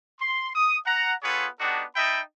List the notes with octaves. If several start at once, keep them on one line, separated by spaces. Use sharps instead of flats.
C6
D#6
F#5 A#5
B3 F4 G#4 A4 B4 C#5
B3 D4 D#4 F#4 G4 A4
D#4 D#5 E5 G5 A5 B5